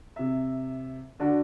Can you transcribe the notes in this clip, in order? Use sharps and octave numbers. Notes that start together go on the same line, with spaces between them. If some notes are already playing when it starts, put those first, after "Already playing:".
C3 E5
D3 D4 F#4